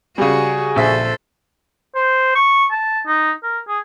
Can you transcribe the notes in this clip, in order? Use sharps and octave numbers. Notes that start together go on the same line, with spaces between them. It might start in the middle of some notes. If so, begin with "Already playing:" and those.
C#3 G3 F#4 G#4
A#1 A4 C5 E5 B6
C5
C#6
A5
D#4
A#4
G#4